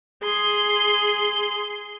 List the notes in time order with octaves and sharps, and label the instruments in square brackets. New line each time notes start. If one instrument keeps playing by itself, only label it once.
[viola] G#4 C6